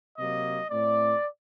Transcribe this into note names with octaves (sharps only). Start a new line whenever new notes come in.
C3 F#3 A#3 D#5
A2 A3 C4 D5